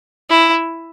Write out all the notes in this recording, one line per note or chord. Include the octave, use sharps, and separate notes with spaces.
E4